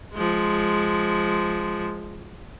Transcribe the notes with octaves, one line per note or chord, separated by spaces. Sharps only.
F3 G#3